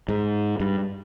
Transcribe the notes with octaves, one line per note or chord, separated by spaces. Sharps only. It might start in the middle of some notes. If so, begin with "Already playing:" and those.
G#2
G2